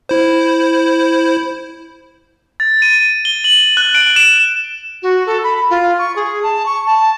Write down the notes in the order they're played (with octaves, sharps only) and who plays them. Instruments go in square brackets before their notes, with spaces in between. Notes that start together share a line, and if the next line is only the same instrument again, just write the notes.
[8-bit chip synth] E4 C5
[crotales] A6
D#7
G7
F#7
F#6
D7
E7
[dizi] F#4
A4
B5
F4
C#6
G#4
A5
C#6
A5